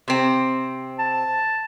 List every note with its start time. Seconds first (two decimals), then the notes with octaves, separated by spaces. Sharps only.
0.08 C3 C4
0.99 A5